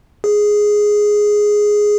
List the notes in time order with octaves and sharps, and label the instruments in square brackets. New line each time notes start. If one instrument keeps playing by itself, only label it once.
[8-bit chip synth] G#4